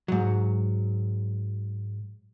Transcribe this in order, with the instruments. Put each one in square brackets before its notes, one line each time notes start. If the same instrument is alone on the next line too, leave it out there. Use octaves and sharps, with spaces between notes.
[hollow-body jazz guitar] G#2 F#3